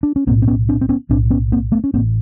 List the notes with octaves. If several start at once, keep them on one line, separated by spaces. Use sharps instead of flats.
D4
C#4
B1 A2 A#3 C4
C4
B3 C#4
C4 D4
C4
B3 C#4
B1 A2 C4 D4
B3 C#4
A#3 C4
A3 B3
C#4
A1 A2 A#3 C4